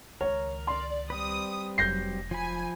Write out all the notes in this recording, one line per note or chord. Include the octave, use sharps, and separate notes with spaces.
C#2 D#3 A#4 C#5
D5 C6
G3 C4 B4 D#6
F1 F#3 D#4 G6 A#6 C7
F3 G#5 B5